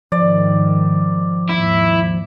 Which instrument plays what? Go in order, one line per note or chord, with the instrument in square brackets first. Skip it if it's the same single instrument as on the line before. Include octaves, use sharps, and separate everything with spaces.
[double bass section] G#2 D#3 [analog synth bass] F3 [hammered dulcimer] D5
[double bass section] D#2 G#2 [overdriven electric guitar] E4